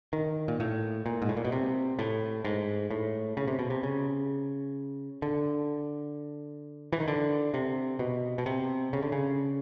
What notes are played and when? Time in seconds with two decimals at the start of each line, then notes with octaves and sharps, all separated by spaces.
0.13 D#3
0.48 A#2
0.60 A2
1.06 A#2
1.22 G#2
1.29 A2
1.37 A#2
1.45 B2
1.52 C3
1.99 A2
2.45 G#2
2.91 A2
3.37 C#3
3.48 C3
3.59 B2
3.70 C3
3.83 C#3
5.22 D3
6.93 E3
7.00 D#3
7.08 D3
7.54 C3
7.99 B2
8.38 B2
8.46 C3
8.93 C#3
9.02 D3
9.12 C#3